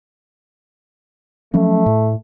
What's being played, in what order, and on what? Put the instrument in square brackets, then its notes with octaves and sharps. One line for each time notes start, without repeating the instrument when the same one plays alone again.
[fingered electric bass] F3 F#3 C#4 [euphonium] A3
[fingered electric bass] A2